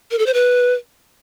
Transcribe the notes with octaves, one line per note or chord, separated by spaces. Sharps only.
A#4
A4
C5
B4